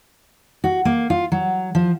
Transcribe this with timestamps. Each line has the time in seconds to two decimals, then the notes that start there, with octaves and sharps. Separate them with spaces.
0.64 F#4
0.85 A#3
1.10 F4
1.32 F#3
1.75 F3